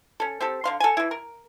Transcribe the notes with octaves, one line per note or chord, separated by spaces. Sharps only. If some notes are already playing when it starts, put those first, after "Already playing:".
C#4 A4
C4 G4 A4
D3 F5 C6
A4 G#5
E3 E4
A#4